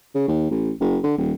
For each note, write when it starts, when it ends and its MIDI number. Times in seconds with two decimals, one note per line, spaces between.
0.15 0.27 49
0.28 0.50 39
0.51 0.71 33
0.80 0.98 30
1.03 1.14 50
1.18 1.33 27